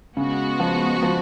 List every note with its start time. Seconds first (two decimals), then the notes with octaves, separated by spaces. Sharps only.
0.17 C#3 G#3 B3 F#4
0.60 F3
1.03 F3